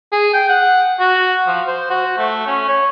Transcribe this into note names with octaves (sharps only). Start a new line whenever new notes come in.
G#4
G5
F#5
F#4
F3
C5
F#4
A3
C#4
C#5